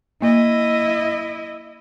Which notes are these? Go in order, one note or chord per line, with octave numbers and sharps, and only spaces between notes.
A#3 E4 D#5